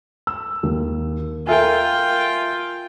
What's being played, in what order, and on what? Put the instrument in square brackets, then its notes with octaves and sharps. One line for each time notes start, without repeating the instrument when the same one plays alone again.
[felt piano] E6
D#2
[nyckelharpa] F4 G5 [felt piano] A#4 E5 G#5